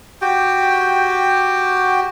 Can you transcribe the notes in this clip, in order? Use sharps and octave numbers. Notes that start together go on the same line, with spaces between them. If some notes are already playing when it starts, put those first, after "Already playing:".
F#4 G4 G5